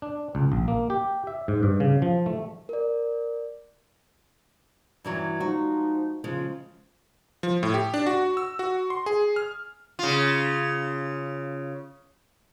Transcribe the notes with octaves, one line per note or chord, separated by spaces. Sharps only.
D4
C#2
A#1
A#3
G4
E5
G#2
G2
C#3
F3
A3
A#4 D5
G2 E3 F#3
F3 G#3 D#4 F#4
C#3 F3 G#3
F3
A2
G4
D4
F#4
E6
F#4
C6
G#4
F6
C#3 F4